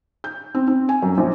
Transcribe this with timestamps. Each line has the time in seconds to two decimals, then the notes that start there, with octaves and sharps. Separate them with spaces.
0.24 G6
0.55 C4
0.68 C4
0.89 G#5
1.02 F#2
1.17 A#1